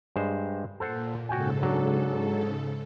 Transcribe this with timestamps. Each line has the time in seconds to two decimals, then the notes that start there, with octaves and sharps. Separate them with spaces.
0.16 G2 G#3 C5
0.80 A#2 A4 C5 F#5
1.29 G#2 C#3 F#4 A4 G5 G#5
1.63 F#3 D4